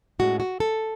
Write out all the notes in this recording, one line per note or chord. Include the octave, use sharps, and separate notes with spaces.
A2 G#3 C#4 F#4
F#4
A4